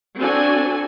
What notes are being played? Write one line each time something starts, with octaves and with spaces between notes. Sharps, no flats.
C4 D4 F#4 A4 G#5